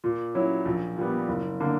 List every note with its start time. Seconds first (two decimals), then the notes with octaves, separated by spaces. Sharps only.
0.04 A#2
0.35 F#3 C#4 E4
0.66 A#1
0.97 A#2 G3 B3
1.28 F#1
1.60 D3 A#3